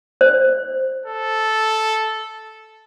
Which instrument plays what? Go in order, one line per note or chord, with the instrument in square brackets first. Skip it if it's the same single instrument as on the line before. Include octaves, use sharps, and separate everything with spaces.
[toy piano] C5
[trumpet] A4